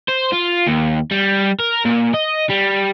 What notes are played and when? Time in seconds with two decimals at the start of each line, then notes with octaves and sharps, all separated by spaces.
0.09 C5
0.33 F4
0.67 D#2
1.11 G3
1.60 A#4
1.85 A#2
2.14 D#5
2.50 G3